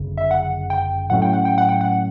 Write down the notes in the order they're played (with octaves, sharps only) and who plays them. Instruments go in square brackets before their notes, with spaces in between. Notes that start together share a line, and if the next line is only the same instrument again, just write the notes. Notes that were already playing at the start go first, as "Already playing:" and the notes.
Already playing: [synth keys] G1 F#2 C#3
E5
F#5
G5
A2 F#3 A3 C#4 F#5
G5
F#5
G5
F#5
G5
F#5